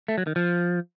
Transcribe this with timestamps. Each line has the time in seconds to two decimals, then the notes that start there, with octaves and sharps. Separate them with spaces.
0.08 A3
0.18 F#3
0.27 D#3
0.36 F3